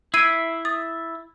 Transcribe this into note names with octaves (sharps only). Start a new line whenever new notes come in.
E4 E5 E6 G#6 C7 D7 D#7
D#6 A6